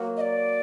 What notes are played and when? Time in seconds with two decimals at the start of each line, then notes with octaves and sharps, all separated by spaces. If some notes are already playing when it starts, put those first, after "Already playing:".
Already playing: F#3 A#3 F#4
0.17 D#5
0.21 D5